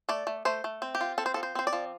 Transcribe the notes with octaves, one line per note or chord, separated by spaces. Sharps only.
A3 D5
A3
A3 C5
A3
C4
G4
F4
C4 A4
C5
F3 A4
C5
C4 C5
D5
F3